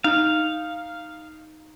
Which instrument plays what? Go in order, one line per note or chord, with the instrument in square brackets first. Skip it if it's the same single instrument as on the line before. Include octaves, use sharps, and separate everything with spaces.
[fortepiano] D#4 [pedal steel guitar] F5